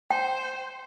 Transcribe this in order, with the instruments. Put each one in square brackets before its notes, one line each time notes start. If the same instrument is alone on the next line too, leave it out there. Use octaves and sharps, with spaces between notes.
[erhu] C5 [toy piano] G5